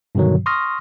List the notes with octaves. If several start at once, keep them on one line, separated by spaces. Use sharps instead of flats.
G2 B2 D3 D#3 F#3
C6 C#6 D#6 F6 A#6